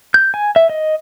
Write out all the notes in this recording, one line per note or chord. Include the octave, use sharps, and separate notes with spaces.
G6
G#5
E5
D#5